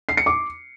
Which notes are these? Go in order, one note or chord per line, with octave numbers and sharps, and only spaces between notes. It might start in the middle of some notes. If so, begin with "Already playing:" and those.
C7
C#7
D6